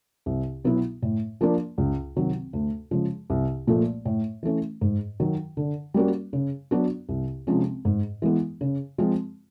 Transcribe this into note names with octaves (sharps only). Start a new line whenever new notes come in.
C2
B2 F#3 B3 E4
A2
F3 A#3 D4
C#2
C3 D#3 F#3
D2
C#3 F3 G#3
C2
A#2 F3 A3
A2
E3 A3 C#4
G#2
D#3 F#3
D3
G3 A#3 C#4 F#4
C#3
F#3 B3 D4 F#4
C2
C3 F3 G#3 C#4
G#2
E3 G#3 B3
C#3
F3 G#3 C4 F4